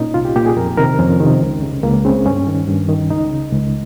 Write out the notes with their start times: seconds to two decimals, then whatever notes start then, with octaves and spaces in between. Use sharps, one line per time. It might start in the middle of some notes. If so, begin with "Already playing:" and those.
Already playing: A#2 C#4 D#4
0.14 C2 F4
0.25 G4
0.36 A#2 G4
0.46 G#4
0.56 F2 A#4
0.78 C3 D#3 A#4
0.98 F2 C#4
1.20 C3 D#3
1.42 C#2
1.62 C#3
1.83 C#2 A#3
2.05 C#3 C4
2.26 G2 C#4
2.47 D#3
2.68 G2
2.89 D#3
3.10 C#2 D#4
3.31 C#3
3.52 C#2